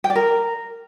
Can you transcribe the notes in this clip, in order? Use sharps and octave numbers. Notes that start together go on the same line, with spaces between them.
G5
D5
A#4